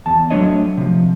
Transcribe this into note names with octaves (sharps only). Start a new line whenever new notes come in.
E2 A5
F#3 A3 D4 C#5 D#5
C3 F3